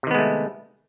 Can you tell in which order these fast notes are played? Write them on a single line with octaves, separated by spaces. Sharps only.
C3 D#3 B3 G#3 A3